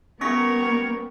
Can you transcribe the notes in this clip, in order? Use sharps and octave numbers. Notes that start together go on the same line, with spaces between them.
G3 B3 C#4 A#4 C#5 C#6 A#6